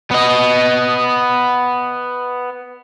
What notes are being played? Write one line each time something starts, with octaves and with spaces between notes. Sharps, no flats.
B3 D#5